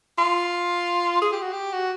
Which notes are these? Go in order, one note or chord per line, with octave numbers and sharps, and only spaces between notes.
F4
G#4
G4
F#4
G4
F#4